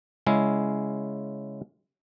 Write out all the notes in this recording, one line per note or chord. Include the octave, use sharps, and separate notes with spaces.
C#3 G#3 C#4 E4